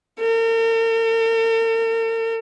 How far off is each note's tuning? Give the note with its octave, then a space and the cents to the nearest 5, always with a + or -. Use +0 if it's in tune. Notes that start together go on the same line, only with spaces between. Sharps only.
A#4 -45